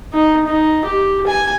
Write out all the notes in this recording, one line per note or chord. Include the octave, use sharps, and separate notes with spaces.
D#4
D#4
G4
G#5